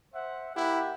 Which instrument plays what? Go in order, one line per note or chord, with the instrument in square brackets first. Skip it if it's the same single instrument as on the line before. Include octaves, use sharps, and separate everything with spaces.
[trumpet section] C5 E5 F#5
[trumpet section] A#3 G4 F#5 [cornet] E4